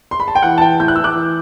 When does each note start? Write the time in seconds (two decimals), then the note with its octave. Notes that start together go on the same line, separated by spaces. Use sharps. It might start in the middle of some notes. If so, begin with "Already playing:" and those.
0.11 C6
0.20 B5
0.28 A5
0.35 G5
0.43 E3 F#5
0.58 A5
0.61 E3 G5
0.80 A2 G6
0.88 F#6
0.96 E3 E6
1.04 D6 F#6
1.16 E3